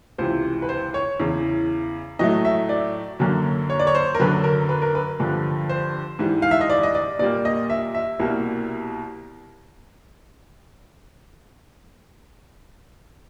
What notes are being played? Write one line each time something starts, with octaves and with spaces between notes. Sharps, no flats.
C#2 C3 E3 C5
B4
C5
C#5
E2 C#3 E3
A2 F#3 A3 D#5
E5
D5
F#2 D3 F#3 A#3
C#5
D5
C#5
C5
A#4
F#2 D3 F#3 B4
A#4
B4
A#4
B4
G2 D3 F3
C5
G#2 E3 G3
F5
E5
D#5
D5
D#5
D5
A#2 G3 A#3 D5
D#5
E5
E5
C2 B2 G3 A#3